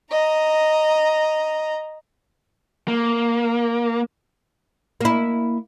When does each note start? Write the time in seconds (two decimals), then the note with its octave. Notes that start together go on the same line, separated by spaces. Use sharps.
0.11 D#5 A#5
2.88 A#3
5.01 A#3 E4